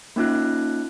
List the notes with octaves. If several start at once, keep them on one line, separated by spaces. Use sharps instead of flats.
A#3 C#4 D#4 F4 F#6